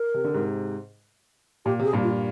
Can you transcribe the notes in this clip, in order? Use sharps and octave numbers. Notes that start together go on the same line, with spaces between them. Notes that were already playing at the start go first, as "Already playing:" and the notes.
Already playing: A#4
C3
D3
G#2 C3
A#2 G4
C3 G#4
G2 A#2
F4